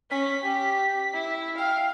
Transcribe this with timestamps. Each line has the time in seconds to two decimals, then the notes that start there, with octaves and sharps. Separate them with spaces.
0.10 C#4 B6
0.43 G4
1.14 E4
1.58 F5 G5